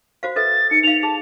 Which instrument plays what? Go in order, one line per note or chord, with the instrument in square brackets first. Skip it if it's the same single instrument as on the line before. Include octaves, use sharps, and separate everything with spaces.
[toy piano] F#4 C5 F5
[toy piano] A4 B4 E5 [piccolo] A6
[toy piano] D#4 [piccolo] C#7
[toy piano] D#4 F5 [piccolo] F7
[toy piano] G#4 [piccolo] A5